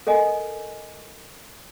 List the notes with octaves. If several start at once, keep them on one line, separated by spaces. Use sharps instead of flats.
A4 A#4 D#5 G#5